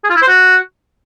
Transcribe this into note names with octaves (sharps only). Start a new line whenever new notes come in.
G#4
F4
E4
C5
F#4